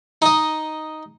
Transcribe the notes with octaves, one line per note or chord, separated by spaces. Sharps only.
D#4 D#5